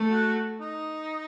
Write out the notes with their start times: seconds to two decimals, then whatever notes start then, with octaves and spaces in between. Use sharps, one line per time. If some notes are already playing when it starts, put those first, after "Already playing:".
Already playing: A3
0.11 F#4
0.61 D#4